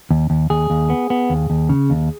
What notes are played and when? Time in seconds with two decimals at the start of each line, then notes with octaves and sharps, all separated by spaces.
0.11 D#2
0.30 D#2
0.50 D#2 G#4
0.70 D#2
0.90 B3
1.10 B3
1.30 D#2
1.50 D#2
1.69 C#3
1.90 D#2